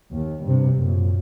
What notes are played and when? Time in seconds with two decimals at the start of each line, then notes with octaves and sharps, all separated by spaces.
0.13 D#2
0.44 G2 C3
0.73 F#2 A#2